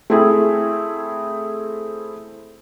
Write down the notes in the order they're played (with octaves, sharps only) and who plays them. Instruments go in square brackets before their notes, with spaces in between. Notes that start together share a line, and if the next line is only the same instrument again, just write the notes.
[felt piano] A3 C4 E4 G#4